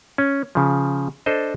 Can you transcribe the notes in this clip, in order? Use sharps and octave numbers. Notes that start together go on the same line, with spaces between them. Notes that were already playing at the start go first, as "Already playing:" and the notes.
C#4
C#3 F3
D4 A4 C5 D#5